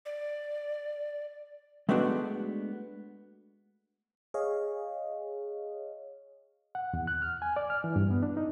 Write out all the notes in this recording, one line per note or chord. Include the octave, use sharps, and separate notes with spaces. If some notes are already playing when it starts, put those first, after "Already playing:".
D5
G#3 A3 B3 D4 F#4
G#4 C#5 D#5 F5
F#5
E2
F#6
F6
G#5
D5
F6
E3
G2
B3
D4
D#4